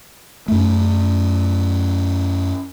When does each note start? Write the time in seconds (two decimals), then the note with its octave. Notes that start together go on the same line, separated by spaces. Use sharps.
0.48 F#2 A3